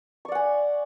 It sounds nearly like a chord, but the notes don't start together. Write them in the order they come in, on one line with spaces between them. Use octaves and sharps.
C#6 D5 F#5 G#5